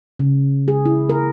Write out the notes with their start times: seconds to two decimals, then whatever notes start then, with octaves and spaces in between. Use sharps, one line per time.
0.19 C#3
0.68 G#4
0.86 E4
1.09 A#4